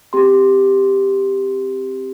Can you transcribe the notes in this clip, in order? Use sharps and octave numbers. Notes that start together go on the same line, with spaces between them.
C4 G4 C6